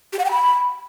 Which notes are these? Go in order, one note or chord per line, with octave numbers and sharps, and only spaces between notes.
G4
F#5
G5
B5